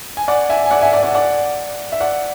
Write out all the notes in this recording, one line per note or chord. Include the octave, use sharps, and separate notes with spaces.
G#5
D5 F#5
E5 G#5
G#5
D5 F#5
E5 G#5
D5 F#5
D5 F#5
D5 F#5
E5
D5 F#5